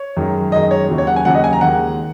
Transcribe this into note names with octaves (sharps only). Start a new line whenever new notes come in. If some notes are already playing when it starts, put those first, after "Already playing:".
Already playing: C#5
F#2 D#3 G#3
F#2 D#3 G#3 D#5
C#5
D#2 C#3 F#3
C#5
F#5
G#5
D#2 C#3 F#3 F#5
D#5
G#5
A#5
D#2 D#3 G#3 F#5